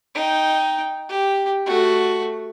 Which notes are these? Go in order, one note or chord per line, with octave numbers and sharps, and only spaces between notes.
D#4 G5
G4
A3 F#4